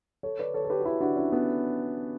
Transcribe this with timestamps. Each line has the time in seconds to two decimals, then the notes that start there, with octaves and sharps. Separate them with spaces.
0.23 A4 C#5
0.39 B4 D5
0.54 A4 C#5
0.65 A4
0.70 G4 B4
0.79 F#4
0.85 E4 G4
1.00 D4 F#4
1.16 C#4 E4
1.32 B3 D4